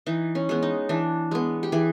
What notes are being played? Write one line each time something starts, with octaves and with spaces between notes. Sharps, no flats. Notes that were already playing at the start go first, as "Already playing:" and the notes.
E3 D#4
C#4
G#3 B3
D#4
E3 D4
G#3 B3
G4
E3 G#4